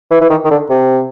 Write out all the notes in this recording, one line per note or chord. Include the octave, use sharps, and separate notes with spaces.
E3
E3
D#3
D#3
D3
C3